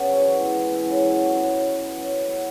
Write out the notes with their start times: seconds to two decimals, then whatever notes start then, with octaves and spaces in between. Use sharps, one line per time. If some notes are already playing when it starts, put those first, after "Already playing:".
Already playing: C#3 B3 C#4
0.08 F#3 E4
0.25 E3
0.39 G#3 B3
0.55 E3
0.71 B3 E4
0.86 C#3
1.03 F#3 E4
1.18 B2
1.34 G#3 C#4 E4
1.49 F#3
1.66 E4
1.81 B2
1.97 F#3 C#4
2.12 C#3
2.28 F#3 B3 E4